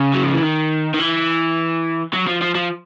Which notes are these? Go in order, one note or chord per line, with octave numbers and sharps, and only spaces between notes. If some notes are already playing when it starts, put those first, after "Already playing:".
Already playing: C#3
F#3
F3
E3
D#3
D#3
E3
F#3
F3
F3
F3